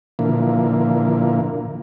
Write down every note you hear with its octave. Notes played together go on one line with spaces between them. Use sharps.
A#2 D3 E3 F3 A#3